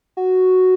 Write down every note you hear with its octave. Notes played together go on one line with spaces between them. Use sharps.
F#4